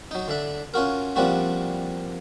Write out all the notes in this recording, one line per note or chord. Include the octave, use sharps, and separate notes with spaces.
F#3 D#4
D3 D4 E5
C#4 F4 F#4 A#4
F3 G3 A#3 C4 D4 F#4